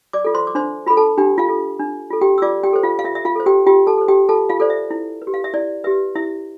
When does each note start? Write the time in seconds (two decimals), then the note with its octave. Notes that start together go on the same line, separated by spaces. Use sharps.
0.13 D5 D6
0.25 F4 A4
0.34 C5 C6
0.47 D6
0.55 D4 C5 C6
0.86 F4 A4 B5
0.97 A4 A5
1.17 D4 G4 G5
1.38 F4 F5
1.48 F4 A4
1.80 D4
2.10 F4 A4
2.21 G4 G5
2.38 E6
2.42 F4 D5 D6
2.64 G4 G5
2.73 A4 C5
2.83 F4 F5
2.99 F5
3.04 F4 E5
3.15 E5
3.25 F4 F5
3.36 A4 C5
3.46 G4 G5
3.67 F4 G4 G5
3.87 A4 A5
3.98 A4 C5
4.08 G4 G5
4.29 F4 A4 A5
4.49 F4 F5
4.60 A4 C5 D5
4.70 E5
4.91 E4
5.22 B4
5.27 G4
5.34 F5
5.44 E5
5.54 E4 D5
5.84 G4 B4 E5
6.15 E4 E5